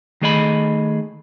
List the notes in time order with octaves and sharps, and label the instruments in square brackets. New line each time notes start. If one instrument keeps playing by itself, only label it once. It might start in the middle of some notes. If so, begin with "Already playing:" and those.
[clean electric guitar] D#3 A3 G#4 D#5 F5 B5